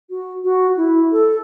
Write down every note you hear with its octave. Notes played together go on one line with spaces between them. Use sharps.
F#4
F#4
E4
A4